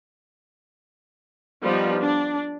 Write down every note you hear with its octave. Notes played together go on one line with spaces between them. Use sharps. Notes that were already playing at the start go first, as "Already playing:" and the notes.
F3 G3 B3 D#4
D4